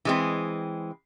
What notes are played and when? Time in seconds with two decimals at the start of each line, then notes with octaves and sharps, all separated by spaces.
0.05 E3 G#3 C4